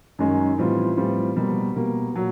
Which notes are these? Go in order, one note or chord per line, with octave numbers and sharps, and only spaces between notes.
F#2 D#3 G#3 C#4
A2 E3 G3 C4 F4
A2 E3 G3 C4 F4
B2 G3 A#3
B2 G3 A#3
A#2 F#3